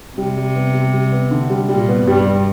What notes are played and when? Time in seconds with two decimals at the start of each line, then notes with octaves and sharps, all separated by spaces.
0.17 C3 G3
0.37 G3
0.55 B3
0.74 G3
0.93 G3
1.12 B3
1.31 D3
1.50 G3
1.69 A#2 G3
1.89 B3
2.07 G2 G3
2.26 G3